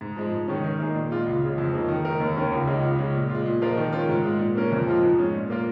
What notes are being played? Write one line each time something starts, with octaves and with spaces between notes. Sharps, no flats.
G#2
F3 G#3
G#2
D#3 G#3 C#4
D#3
A#3 D#4 G#4
A#2
G#3 F4
C#2
C#3 G#3
F2
C#3 A#3 D#4
D#3
G#3 D#4 A#4
D#2
D#3 C#4 A#4
C#2
C#3 G#3 D#4
C#2
C#3 G#3
A#2
F4
G#3
A#2
F3 G#3 F4 A#4
D#3
C#4 F4 A#4
G#2
G#3 F4
A#2
A#3 C#4 A#4
F2
F3 G#3 F4
G#2
G#3 C#4
A#2
A#3 F4 A#4